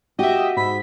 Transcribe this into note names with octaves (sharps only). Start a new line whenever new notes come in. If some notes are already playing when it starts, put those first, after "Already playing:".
F#4 G4 D#5 E5
G#2 B5